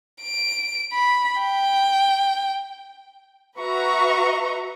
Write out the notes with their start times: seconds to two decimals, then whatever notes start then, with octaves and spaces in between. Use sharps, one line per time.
0.22 D7
0.93 B5
1.41 G5
3.58 F#4 B4 E5 A#5 C#6